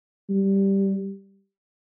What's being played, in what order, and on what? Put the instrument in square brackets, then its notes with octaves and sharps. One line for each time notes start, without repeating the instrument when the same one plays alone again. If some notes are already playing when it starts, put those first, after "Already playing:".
[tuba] G3